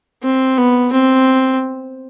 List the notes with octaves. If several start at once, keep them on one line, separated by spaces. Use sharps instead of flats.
C4
B3
C4